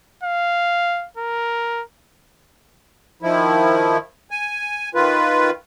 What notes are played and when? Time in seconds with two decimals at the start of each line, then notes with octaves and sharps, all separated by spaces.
0.23 F5
1.17 A#4
3.23 D#3 F3 E4
4.31 G#5
4.95 D#3 F4 B4